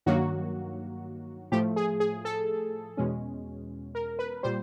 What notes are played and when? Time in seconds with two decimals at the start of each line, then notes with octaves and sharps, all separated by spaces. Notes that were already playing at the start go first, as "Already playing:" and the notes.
0.06 G2 D#3 F#3 A#3 F#4
1.52 A2 F3 A3 G4
1.76 G#4
2.00 G#4
2.25 A4
2.97 E2 B2 G#3 C#4
3.95 A#4
4.19 B4
4.43 A#2 G3 C5